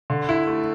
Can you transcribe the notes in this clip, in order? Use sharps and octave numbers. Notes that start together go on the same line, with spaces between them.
D3
E4
A3